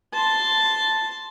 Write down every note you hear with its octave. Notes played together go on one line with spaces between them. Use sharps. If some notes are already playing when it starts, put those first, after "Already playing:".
A5 C6